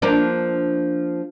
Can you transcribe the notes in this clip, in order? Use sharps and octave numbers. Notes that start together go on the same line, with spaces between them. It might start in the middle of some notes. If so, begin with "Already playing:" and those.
F3 A#3 D4